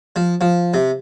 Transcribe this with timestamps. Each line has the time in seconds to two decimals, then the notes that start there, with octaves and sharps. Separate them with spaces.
0.16 F3
0.41 F3
0.74 C3